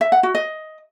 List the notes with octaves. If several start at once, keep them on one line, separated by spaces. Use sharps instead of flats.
E5
F#5
F#4
D#5